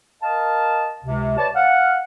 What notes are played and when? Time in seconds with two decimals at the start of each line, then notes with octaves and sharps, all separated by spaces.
0.22 A#4 D#5 F5 A5
1.05 C#2 C3
1.38 B4 C#5 D5 A5
1.55 F5 F#5